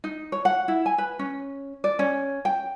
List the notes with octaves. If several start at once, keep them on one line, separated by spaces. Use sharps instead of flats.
D#4
C#5
F#5
E4
G#5
B4
C#4
D5
C#4
G5